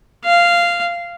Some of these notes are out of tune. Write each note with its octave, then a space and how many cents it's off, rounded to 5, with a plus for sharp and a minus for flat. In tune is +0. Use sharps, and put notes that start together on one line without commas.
F5 -10